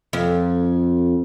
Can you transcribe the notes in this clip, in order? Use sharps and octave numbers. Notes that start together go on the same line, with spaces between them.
F2